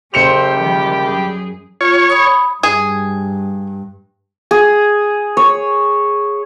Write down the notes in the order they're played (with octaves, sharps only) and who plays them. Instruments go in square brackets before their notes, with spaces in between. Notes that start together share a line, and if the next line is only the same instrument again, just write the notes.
[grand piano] F#1 C#7 F7 [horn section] A#3 A4 C5 [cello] C#4 [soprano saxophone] G4
[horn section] D3 G3 [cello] D#3 F3
[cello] F#2 G#4
[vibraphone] F4 [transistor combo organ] C#5
[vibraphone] B5 D#6
[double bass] G2 [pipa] G#4
[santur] G#4
C#5